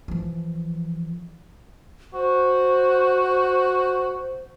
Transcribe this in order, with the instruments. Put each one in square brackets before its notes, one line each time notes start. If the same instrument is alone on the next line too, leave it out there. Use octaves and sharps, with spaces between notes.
[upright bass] E3 F3
[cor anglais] F#4 [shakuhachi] C5